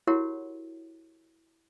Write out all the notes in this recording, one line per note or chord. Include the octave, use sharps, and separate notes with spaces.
E4 F#4 G4 A#4 C#5 F#5